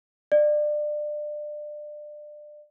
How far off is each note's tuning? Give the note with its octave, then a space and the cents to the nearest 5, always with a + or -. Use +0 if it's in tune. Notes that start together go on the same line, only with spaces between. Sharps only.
D5 +25